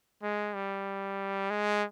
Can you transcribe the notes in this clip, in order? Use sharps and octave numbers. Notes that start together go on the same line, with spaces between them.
G#3
G3
G#3